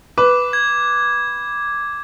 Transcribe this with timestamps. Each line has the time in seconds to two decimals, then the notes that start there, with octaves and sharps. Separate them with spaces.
0.18 B4 D6
0.53 G#6